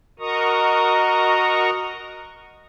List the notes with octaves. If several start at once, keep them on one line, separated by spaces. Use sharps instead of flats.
F#4 A#4 D#5 A#5 C#6 D#6